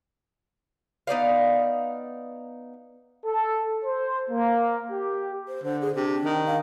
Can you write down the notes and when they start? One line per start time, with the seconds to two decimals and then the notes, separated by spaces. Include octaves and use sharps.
1.07 B3 D#4 D5 F5
3.25 A4
3.85 C5
4.30 A#3
4.91 G4
5.47 C5
5.64 D3 C5
5.81 G#4
5.95 C3 D4
6.25 D#3
6.46 F5